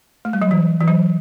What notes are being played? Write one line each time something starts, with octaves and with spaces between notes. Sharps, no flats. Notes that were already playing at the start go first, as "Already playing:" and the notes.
A3
G3
F#3
E3
E3
F#3